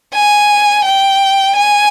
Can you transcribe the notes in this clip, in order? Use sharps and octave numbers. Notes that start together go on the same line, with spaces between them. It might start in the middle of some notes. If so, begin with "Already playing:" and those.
G#5
G5
G#5